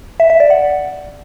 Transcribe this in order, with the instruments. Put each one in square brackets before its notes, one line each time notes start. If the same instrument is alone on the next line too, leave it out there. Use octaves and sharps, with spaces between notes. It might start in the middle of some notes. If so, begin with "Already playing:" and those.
[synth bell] E5
E5
D5
F#5